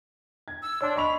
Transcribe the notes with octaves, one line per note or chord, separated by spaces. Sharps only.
G#6
E6
D4 C#5 D5 C6
D#5 B5 C#6 F7